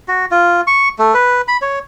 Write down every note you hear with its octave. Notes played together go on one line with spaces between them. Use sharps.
F#4
F4
C#6
A3
B4
B5
C#5